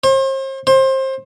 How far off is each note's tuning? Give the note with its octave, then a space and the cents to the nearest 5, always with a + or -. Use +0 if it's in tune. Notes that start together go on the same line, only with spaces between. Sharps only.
C5 +40
C5 +25